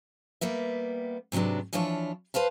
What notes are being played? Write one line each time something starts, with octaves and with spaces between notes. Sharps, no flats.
G3 A#3 B3 E5
G#2 C3 F#3 B3 D4
E3 F3 D4 E4 F4 C#5
B4 C5 F5 A5